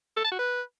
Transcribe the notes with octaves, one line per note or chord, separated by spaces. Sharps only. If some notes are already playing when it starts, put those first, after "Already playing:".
A4
A5
F#4
B4